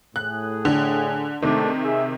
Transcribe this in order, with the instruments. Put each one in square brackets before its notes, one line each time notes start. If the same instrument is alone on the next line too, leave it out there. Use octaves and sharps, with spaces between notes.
[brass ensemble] A2 G#4 [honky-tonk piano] F#6
[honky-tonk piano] D3
[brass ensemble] G#2 A3 D4 [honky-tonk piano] C3 D#3
[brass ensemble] G#4 E5